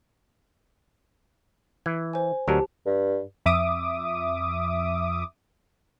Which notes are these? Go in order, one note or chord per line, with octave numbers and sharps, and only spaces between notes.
E3 G#6
C5 G#5
D2 F#3 G4 A#4 A5
G2
F2 E5 D6 D#6